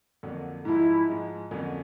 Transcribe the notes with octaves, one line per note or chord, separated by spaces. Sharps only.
F2 D3 F#3 A#3
G#2 F3 G#3 E4
G#2 F3 G#3
F2 D3 F#3 A#3 C#4